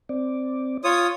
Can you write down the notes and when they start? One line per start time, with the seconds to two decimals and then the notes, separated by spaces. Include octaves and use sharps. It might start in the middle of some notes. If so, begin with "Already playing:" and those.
0.09 C4 D5
0.84 F4 C#5 D#6